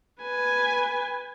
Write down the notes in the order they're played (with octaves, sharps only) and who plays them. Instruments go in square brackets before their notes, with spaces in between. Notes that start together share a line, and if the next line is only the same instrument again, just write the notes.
[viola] B4 G#5